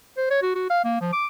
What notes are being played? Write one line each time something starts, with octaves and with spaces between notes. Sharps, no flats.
C5
C#5
F#4
F#4
F5
A#3
F3
D6